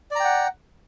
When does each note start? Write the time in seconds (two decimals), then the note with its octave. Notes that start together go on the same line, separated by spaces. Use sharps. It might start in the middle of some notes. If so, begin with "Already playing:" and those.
0.11 D5
0.15 A#5
0.20 G5
0.24 F#5